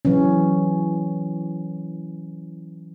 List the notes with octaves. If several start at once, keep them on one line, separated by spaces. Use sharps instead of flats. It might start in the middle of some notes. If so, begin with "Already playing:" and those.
E3 F#3 C#4